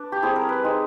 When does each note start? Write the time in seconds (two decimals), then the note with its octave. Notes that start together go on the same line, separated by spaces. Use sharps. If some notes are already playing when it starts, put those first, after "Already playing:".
Already playing: D4 B4
0.12 G4
0.22 G3 C4 E4 G#4
0.36 A#4
0.49 B4
0.62 G#3 C4 D#4